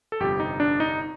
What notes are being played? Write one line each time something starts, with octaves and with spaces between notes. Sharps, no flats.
A4
G1 F2 C3 G3 G4
D#4
D4
D#4